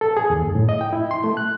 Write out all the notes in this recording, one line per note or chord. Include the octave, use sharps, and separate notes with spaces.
A4
G#4
D#2
F#2
A2
D#5
G5
E4
C6
A3
F#6